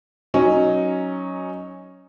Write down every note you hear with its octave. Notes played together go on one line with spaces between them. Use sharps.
F#3 C#4 D#4